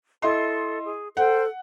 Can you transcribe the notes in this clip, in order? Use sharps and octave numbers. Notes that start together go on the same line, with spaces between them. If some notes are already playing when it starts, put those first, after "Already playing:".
E4 A4 D#5 C6
G#4
A4 C5 F#5 G5